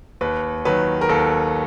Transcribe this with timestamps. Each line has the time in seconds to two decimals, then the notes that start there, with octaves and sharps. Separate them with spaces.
0.21 D#2 B4
0.65 D#3 F#3 B4
1.01 A#4
1.09 D#2 A4